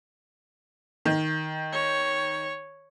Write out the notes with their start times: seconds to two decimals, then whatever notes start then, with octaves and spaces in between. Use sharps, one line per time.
1.05 D#3
1.72 C#5